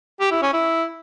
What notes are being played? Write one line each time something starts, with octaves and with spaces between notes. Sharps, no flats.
G4
E4
C#4
E4